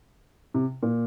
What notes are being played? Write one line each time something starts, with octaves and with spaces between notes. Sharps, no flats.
C3
A#2